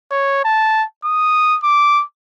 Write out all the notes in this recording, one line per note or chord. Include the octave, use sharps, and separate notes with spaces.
C#5
A5
D#6
D6